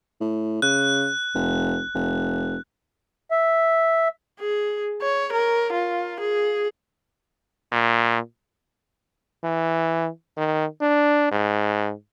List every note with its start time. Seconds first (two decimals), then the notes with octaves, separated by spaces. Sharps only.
0.21 A2
0.62 C#3 F#6
1.35 F1
1.95 F1
3.31 E5
4.40 G#4
5.02 C#5
5.33 A#4
5.73 F4
6.20 G#4
7.72 A#2
9.43 E3
10.37 D#3
10.81 D4
11.31 G#2